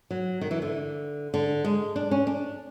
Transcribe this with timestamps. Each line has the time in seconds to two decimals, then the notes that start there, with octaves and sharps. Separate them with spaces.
0.11 F#3
0.41 D#3
0.51 E3
0.62 D3
1.34 D3
1.64 G#3
1.96 D4
2.11 C#4
2.27 D4